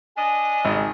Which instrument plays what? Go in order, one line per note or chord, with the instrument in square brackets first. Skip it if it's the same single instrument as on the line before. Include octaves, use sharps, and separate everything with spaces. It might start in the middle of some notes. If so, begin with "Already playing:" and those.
[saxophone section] D4 D#5 [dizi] G#5
[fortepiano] G#1